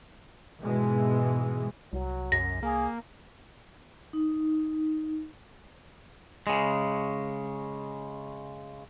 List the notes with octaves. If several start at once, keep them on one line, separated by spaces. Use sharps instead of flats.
G#2 B2 E3 G#3
C2 F#3
F#2 A#6
A#3 G#4
D#4
C#3 G#3